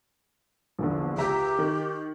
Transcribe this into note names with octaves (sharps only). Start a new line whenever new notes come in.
A#1 E2 D3
C#2 G4 E5 A#5
D#3